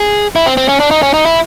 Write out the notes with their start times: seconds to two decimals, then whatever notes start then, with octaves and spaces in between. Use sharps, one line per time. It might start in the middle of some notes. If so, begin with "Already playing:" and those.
Already playing: G#4
0.36 E4
0.46 C4
0.57 C4
0.69 C#4
0.80 D4
0.91 D#4
1.03 C#4
1.14 D#4
1.25 E4